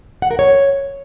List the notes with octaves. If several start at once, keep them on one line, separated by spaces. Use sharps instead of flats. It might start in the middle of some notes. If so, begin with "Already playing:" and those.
F#5
A#4
C#5